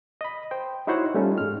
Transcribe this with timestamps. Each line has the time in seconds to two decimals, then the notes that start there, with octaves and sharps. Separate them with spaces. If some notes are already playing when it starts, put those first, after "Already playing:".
0.21 D#5 B5
0.51 C5 G5
0.87 D#4 E4 F#4 C5 C#5 F#5
1.15 G3 A3 C#4 D#4 F4
1.38 G#2 G#3 F6